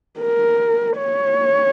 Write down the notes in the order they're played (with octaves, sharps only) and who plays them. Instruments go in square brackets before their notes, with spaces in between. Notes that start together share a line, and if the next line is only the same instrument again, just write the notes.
[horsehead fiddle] A#4
C#5